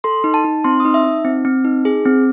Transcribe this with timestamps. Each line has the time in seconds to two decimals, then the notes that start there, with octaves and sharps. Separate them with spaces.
0.04 A4 C6
0.24 D#4
0.34 A5
0.45 D#4
0.64 C4 C6
0.80 D#4 D#6
0.94 E5
1.04 D#4
1.25 C4
1.45 C4
1.65 D#4
1.85 G#4
2.05 C4